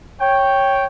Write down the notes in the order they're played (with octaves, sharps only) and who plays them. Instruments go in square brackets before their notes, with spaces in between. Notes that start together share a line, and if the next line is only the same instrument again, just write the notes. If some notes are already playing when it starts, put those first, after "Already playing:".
[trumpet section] C#5 G5